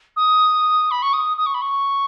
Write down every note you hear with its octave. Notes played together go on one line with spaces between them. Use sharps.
D#6
B5
C#6
D#6
D#6
C#6
B5
C#6